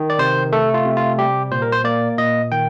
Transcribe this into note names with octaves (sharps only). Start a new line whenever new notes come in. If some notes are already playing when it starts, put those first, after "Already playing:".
Already playing: D#3
D5
C3 C5
A3 A4
F4
C3
F4
G3 G4
A#2 C5
A#4
C5
A#3 D5
A#2 D#5
D#3 G5